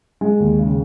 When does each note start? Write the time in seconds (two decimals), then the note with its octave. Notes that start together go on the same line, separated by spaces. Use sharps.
0.21 G#3
0.40 D#2
0.59 C#3